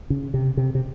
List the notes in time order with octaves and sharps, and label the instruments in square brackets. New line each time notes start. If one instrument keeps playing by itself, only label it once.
[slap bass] C#3
C3
C3
C3